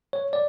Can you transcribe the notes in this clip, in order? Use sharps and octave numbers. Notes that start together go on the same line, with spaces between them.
C#5
D5